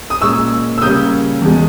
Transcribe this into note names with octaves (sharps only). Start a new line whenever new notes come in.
D#6
A#2 G#3 C#4 C#6 E6
E6
C#3 G3 A#3 C#4 D#6 G6
E2 B2 G#3